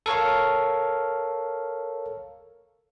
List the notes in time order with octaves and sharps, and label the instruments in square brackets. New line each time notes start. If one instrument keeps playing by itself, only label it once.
[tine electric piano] A4 A#4 C#5 F5